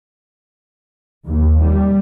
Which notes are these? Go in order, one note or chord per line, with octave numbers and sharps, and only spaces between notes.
D#2
G3